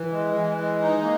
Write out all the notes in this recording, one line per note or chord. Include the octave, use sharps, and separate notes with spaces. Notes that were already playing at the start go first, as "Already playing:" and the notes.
Already playing: E3
G#3
E3
G#3
D#4
A#3